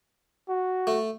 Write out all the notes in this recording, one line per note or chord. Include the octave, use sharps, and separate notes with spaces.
F#4
A3